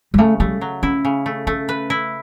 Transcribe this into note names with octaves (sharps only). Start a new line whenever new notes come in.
G3
C#3 A3
G3 A3
F#3
C#4 E4
C#3
A3
A3 C#4
B4
E4